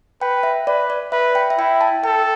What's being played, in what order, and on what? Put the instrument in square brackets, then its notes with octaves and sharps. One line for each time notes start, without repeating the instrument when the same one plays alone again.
[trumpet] B4 [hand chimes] G5
[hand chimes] E5
[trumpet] B4 [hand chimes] D5
[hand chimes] D5
[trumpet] B4 [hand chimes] E5
[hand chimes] G5
E5
[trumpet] E4 [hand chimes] G5
[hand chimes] A5
[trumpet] A4 [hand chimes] G5